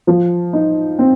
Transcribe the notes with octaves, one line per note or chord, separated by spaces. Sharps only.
F3
D#4
C4